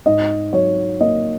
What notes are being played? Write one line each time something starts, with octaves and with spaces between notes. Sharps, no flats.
G#2 D#5
F#3 C#5
A#3 D#5